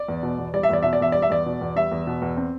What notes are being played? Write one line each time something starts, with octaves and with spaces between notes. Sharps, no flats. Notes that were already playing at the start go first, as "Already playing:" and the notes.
Already playing: D5
E2
B2
E2
G3 D5
E5
E2 D5
B2 E5
D5
E2 E5
G3 D5
E5
E2 D5
B2
E2
G3 E5
E2
B2
E2
C4